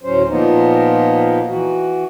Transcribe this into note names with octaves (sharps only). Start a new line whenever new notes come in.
D2 A2 F#3 C#4 C5
A#2 F3 A#3 B3 D#4
E3 F#4